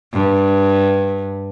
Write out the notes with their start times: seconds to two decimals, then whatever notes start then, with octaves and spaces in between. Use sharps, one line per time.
0.13 G2